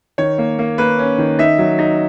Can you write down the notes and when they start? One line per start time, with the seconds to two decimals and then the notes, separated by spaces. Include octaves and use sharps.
0.18 D#3 C#5
0.38 A#3
0.59 A#3
0.78 A#3 B4
0.99 C#4
1.18 D#3
1.39 D#4 E5
1.58 F#3
1.79 D#4